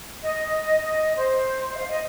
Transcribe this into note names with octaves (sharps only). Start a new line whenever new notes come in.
D#5
D#5
C5
D#5
F5
D#5